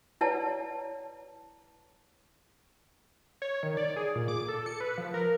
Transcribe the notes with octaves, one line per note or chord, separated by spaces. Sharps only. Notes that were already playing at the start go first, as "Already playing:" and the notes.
E4 B4 C#5 D5 F#5 A5
C#5
D#3
D5
G#4
A#2
D6
A4
C#7
B4
F3
A#4